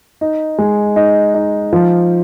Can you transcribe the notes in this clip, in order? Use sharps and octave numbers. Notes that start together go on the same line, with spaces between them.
D#4
G#3
D#4
D#4
F3